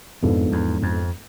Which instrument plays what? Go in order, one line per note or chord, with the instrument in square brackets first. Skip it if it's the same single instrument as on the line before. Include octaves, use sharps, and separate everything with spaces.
[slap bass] F2 [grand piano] G#2 F3 B3 D4 A4
[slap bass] E2
F2